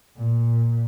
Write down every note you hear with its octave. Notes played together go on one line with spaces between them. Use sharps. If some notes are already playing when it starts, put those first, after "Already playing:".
A#2